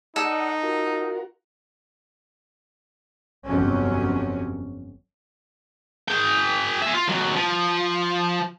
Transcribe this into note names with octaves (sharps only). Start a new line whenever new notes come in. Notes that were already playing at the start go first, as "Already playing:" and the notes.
D#4 A4 D5 D#5 F#5
F4 F#4 A#4
G1 F2 C3 F#3 C#4
G#4 G5
G#4 E5
F4
D#2 F#3
F3